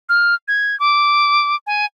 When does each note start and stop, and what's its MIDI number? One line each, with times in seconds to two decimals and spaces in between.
0.09 0.35 89
0.48 0.78 92
0.80 1.56 86
1.67 1.85 80